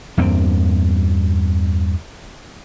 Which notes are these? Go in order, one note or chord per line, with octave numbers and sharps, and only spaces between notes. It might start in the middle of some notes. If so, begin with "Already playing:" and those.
E2 G2 A#3 C4